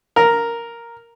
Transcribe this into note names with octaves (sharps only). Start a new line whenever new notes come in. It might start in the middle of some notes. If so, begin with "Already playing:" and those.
A#4